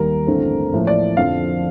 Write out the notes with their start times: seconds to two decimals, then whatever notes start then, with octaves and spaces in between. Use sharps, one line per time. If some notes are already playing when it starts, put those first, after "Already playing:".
Already playing: D#2 D#3 G3 A#3 A#4
0.27 A1 G2 D3 A3 C4
0.72 A1 A2 F3 A#3
0.87 D5
1.17 F2 D3 F3 C4 F5